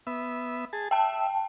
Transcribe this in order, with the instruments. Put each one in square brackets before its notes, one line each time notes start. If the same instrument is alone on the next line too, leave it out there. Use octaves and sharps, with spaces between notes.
[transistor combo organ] B3 E5
G#4 A5
[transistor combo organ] E5 [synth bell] G5 A5